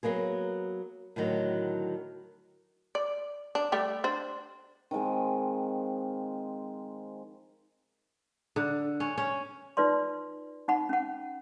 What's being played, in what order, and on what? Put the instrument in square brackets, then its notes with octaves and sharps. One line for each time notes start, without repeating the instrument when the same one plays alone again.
[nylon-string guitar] F#3 A#3 B3 G#4
A2 D3 D#3 F#3
[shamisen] D5
D4
G3 A3 G4
D4 C5
[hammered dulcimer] D#3 F3 G#3 C4
[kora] D3
C#4
C#4
[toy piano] D#4 F4 B4 D5 C6
D#4 F#5 B5
C#4 F#5